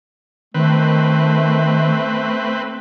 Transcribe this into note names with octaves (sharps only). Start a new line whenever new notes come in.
D#3 A3 C4 B4